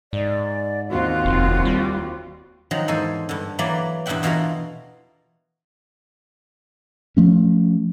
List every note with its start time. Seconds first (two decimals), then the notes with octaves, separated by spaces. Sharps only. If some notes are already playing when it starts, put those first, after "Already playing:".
0.13 G#2 D5
0.89 D#2 C4 F4 F#4
1.25 F1
1.65 G3
2.71 D#3 F3 F#3 G#3
2.88 E2 G#2 A4 C5 G#5
3.29 G2 D3
3.59 E3 F#3 A#3 D5 B5
4.06 E2 G2 A#2 E5 F#5 G5
4.23 B2 E3 F4 F#4 A4 A#4
7.17 F3 A3 C#4